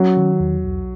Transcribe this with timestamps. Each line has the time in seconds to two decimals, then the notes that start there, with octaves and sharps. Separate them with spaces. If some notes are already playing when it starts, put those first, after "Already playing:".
Already playing: F#3 C#4
0.17 D#3
0.40 E2
0.64 B1